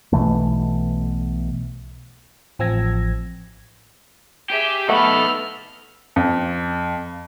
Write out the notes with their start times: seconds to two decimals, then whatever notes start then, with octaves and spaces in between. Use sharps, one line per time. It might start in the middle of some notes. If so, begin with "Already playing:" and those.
0.13 B1 B2 E3 A3
2.59 A1 F3 C4 E6 G#6 A#6
4.50 G4 G#4 E5
4.89 A3 B3 D#4 A4 B5 F6
6.16 F2